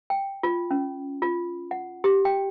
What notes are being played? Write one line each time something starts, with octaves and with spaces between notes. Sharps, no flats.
G5
F4
C#4
F4
F#5
G4
G5